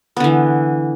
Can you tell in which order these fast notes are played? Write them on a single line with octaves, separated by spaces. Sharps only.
B3 D3 E3